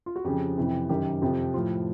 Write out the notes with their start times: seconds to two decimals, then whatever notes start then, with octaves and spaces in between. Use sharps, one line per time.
0.06 F4
0.16 F#4
0.24 F2 C#3 F3 G4
0.57 F2 C3 E3
0.89 F#2 D#3 G4
1.22 F2 C3 F3
1.54 A2 F3 F4